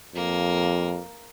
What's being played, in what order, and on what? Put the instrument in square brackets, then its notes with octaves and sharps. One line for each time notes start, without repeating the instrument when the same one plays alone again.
[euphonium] F2 [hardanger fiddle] A#3